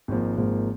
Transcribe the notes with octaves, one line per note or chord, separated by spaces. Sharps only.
G#1 G#2 F3 A#3
G#1 G#2 F3 A#3